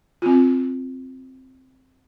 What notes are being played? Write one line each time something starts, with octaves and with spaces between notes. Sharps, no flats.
C4 F4